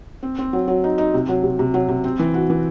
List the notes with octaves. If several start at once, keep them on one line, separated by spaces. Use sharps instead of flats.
C4
C4
F#3
F#3
D#4
D#4
C3
F#3
C3
C3
F#3
C3
C4
E3
F#4
E3